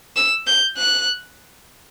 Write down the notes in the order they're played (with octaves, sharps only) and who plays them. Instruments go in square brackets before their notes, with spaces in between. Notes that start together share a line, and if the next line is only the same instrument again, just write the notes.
[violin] E6
G6
F#6